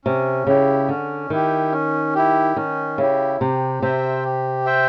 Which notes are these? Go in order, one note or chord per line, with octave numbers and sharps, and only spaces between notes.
C3 C#4
C#3 E4 G4
D3 C#4
D#3 E4 G4
C#4
E4 G4
D#3 C#4
C#3 E4 G4
C3 G4
C3 C5 E5 G5
G4
C5 E5 G5